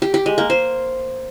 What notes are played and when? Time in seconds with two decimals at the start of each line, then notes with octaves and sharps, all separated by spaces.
0.02 G4
0.14 G4
0.26 G#3
0.38 A#3
0.50 C5